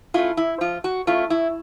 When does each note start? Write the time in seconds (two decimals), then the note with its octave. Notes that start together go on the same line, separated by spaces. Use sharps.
0.14 A3 C#4 E4 F4
0.37 E4
0.61 F3 F4
0.84 F#4
1.07 A3 C#4 E4 F4
1.30 E4